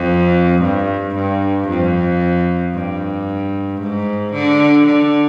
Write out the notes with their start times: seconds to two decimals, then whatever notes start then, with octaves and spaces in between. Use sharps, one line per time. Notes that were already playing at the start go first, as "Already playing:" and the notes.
Already playing: F2
0.62 G2
1.15 G2
1.68 F2
2.74 G2
3.81 G#2
4.33 D3
4.86 D3